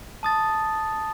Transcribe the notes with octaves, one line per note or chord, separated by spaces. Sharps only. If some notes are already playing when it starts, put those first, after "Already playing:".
A5 D#6 A6